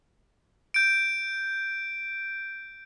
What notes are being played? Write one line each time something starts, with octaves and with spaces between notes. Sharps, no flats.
G6 D7